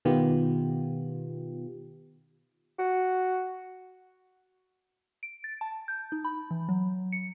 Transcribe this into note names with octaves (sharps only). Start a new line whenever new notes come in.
B2 D#3 B3 F4 G4
F#4
D7
A6
A5
G6
D#4
B5
E3
F#3
C#7